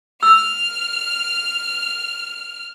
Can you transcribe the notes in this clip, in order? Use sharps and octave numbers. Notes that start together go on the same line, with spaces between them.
E6 F6